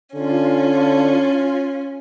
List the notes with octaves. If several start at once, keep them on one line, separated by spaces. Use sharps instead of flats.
D3 C#4 F4